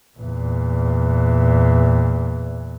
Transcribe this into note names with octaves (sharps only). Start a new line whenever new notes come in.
E2 A#2